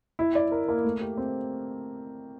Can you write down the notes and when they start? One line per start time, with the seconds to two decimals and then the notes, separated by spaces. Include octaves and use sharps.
0.19 E4
0.35 D5
0.52 A#4
0.68 A#3
0.85 A3
1.01 G4
1.17 C4